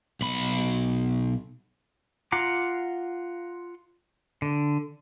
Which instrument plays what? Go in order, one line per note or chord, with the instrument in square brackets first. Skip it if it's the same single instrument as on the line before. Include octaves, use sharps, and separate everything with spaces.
[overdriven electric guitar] B1 B5
[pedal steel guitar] F4 F#5 A#5 D6
D3